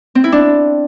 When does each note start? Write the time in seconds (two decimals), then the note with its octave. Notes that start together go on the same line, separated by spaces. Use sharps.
0.15 C4
0.24 E4
0.32 D4